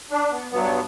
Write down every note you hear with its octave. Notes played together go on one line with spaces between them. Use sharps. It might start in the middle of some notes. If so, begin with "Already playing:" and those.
D4
B3
G2 F#3 B3